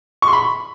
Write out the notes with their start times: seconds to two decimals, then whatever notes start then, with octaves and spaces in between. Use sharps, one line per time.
0.22 C#6
0.28 C6
0.33 B5